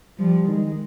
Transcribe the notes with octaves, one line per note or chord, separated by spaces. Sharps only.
F3 G3
D#3 G#3